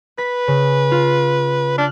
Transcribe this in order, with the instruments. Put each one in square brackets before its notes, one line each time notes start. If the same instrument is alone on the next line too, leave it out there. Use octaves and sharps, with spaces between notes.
[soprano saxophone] B4 [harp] B6
[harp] C#3
F4
[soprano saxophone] D4 [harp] F6 F#6